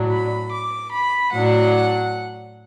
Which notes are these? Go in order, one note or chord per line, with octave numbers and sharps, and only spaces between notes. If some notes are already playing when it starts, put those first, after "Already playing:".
Already playing: A2 F#3 D4
B5
D6
B5
A2 F#3 D4 F#5